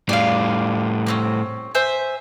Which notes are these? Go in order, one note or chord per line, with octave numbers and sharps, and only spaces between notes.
A2 G3 D5 F5
A#3 C4 C#4
C5 E5 G#5